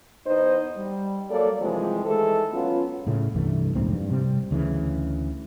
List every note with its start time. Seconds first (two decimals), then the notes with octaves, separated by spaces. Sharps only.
0.27 E2 B3 D#4 C5 D#5
0.77 G3
1.30 F#3 A#3 A4 D5
1.61 C3 E3 F3 G3 G#3
2.05 D#3 E3 G#3 A3 A4
2.53 F#3 B3 C#4 F4
3.07 A2 C#3 A3
3.35 C2 G2 E3 A3
3.75 F1 A#1 G#2 C4
3.93 G2
4.11 C3 G3 C4
4.51 D2 C#3 E3